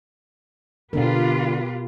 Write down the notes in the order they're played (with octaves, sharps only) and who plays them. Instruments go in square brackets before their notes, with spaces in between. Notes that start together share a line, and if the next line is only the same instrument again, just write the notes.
[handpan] B2 B3 A#4 [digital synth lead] D3 [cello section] F4 G4 B4